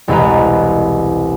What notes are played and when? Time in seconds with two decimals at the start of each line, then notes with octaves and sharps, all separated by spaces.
0.08 E1 C2 G#3 B4 A#5